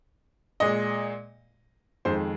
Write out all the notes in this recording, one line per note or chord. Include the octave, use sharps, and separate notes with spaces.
A#2 G#3 D#5
F2 D#3 G#3 C5